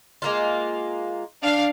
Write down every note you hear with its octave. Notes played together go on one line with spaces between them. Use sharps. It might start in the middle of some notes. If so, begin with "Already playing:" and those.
G#3 A#3 F4
D4 F5